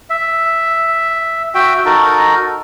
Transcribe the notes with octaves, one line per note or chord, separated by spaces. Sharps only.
E5
F#4 E5 G5
D#4 F#4 A4 A#4